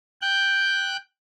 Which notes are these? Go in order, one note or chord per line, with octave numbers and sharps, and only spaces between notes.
G5 F#6 G6